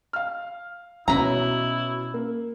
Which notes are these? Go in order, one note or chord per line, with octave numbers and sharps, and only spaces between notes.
F5 F6
B2 C#4 E4 F#4 B4 C#5 A#5
A#3